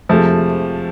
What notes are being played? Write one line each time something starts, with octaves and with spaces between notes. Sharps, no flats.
F2 C3 F3 G#3 A3